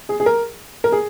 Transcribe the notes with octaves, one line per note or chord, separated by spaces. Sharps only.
G#4
G#4
A#4
A#4
G#4